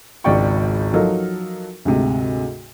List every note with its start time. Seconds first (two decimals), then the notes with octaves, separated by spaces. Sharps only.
0.24 G#1 C#2 D5 G5 C#6
0.94 F3 F#3 D#4 F4 A4 A#4
1.85 D2 G#2 C3